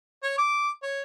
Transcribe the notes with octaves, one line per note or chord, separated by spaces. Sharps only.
C#5
D6
C#5